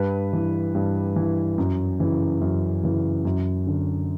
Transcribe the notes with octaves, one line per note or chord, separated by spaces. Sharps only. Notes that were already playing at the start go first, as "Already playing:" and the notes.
Already playing: G2 B4
E3
G2
E3
F#2
C#3 E3
F#2
C#3 E3
F#2
D3